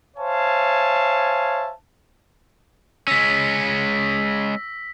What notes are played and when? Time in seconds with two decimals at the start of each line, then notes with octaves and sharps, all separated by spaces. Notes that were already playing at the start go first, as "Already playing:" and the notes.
0.17 C5 C#5 E5 F5 G#5 A5
3.08 G#3 C#4 E6 A#6 B6